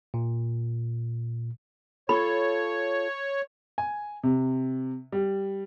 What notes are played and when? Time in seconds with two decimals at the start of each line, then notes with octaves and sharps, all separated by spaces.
0.14 A#2
2.09 F4 A4 C#5 B5 C#6
3.78 G#5
4.23 C3
5.12 G3